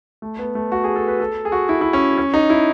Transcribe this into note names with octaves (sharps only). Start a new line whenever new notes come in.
A3
B3
A3
F#4
G#4
A4
B4
A4
G#4
F#4
E4
E4
C#4
C#4
D#4
E4